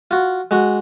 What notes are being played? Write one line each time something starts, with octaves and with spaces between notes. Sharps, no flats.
F4 F#4
G#3 F#4